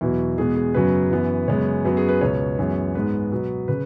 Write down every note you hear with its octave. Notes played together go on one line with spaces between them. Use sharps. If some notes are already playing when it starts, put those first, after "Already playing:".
E2 B2 F#3 E4
E2 B2 G#3 B3 G#4
G#4
F#2 C#3 F#3 B3 B4
F#2 E3 B3
F#2 C#3 G#3 B3 C#5
F#2 F#3 B3 B4
G#4
B4
C#2 B2 B3 C#5
F#2 E3 G#3 B3
G#2 G#3 B3 B4
B2 F#3 B3
C#3 B4